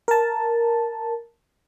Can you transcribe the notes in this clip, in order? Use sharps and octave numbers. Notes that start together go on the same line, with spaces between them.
A#4 A5